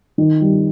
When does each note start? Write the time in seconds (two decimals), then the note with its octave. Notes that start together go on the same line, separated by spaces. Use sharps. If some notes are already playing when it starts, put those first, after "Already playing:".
0.18 D#3
0.41 G3